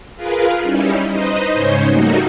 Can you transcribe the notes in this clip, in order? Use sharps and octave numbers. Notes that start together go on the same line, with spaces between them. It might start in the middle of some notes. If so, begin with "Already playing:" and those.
F4 G#4 A#4 B4 F5
G3 C#4 D#4 E4
D#4 B4 C5 D#5
G#2 C#3 C#4 C5 C#5 G6
G3 A3 A#3 D#4 F#4